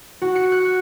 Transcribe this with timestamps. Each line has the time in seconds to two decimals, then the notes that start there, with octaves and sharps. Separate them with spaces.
0.22 F#4
0.35 C#7
0.52 F#6